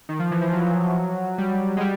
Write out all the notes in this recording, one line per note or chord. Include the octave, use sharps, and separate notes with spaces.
D#3
F3
E3
F3
F#3
G3
G#3
G3